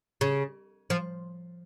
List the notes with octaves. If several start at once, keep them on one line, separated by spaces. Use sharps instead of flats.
C#3
F3